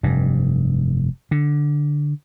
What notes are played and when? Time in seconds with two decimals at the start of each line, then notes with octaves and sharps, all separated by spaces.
0.03 F1 G2
1.31 D3